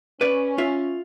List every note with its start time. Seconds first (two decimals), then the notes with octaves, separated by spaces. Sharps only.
0.21 C#4 B4 D5
0.58 F4 E5